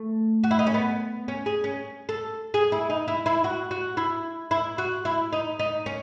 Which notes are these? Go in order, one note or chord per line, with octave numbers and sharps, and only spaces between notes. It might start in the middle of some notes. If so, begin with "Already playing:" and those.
Already playing: A3
F#4
E4
D#4
C#4
B3
C#4
G#4
C#4
A4
G#4
E4
D#4
E4
E4
F#4
F#4
E4
E4
F#4
E4
D#4
D#4
C#4